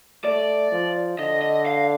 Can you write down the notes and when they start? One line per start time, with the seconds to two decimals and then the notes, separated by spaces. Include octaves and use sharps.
0.25 A3 D5
0.72 F3
1.19 D3 D#5
1.42 D#5
1.67 F5